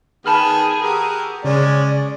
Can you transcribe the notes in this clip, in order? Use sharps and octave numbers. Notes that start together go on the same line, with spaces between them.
D#3 B3 G#4 G5 A5 B5 F6
F#4 G4 A#4 A#5 D#6 E6
C#3 G#3 C#4 C#5 D5 G#5